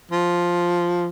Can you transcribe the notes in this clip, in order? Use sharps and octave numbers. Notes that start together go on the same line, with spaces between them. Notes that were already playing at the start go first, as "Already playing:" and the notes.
F3